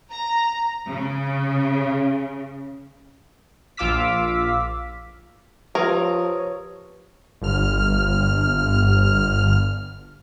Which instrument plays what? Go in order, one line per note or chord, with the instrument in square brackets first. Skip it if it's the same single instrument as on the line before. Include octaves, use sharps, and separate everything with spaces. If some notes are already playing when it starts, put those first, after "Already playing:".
[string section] A#5
C#3
[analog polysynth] A#1 F4 F5 D6 E6 B6
[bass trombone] F3 [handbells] G4 B4 [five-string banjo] A#4 [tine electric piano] C#5 D#6
[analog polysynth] G1 F6